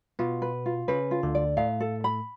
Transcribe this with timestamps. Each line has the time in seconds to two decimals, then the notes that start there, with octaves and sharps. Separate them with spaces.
0.19 B2 B3 F4
0.42 B4
0.66 F4
0.88 C#3 C#4 B4
1.11 F4
1.23 D2 D3
1.35 D5
1.57 A2 A3 F5
1.80 A4
2.04 B5